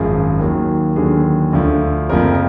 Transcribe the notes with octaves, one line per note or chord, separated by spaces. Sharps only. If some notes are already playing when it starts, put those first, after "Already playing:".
Already playing: G#1 F#2 F3 G#4
D#2 D#3 F#3
D#2 D3 F#3 G#4
D2 D3 F3
F#1 F2 F3 A#4